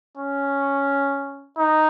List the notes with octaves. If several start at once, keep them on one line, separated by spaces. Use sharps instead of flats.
C#4
D#4